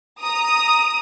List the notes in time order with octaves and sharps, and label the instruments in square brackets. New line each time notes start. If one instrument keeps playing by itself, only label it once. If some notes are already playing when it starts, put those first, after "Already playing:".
[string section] A#5 D#6